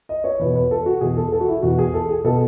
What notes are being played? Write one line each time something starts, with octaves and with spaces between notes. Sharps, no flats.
D#5
C#5
E2 B2 B4
B4
A4
F#4
E2 B2 G#4
A4
A4
F#4
E4
E2 B2 F#4
G#4
A4
G#4
B2 A4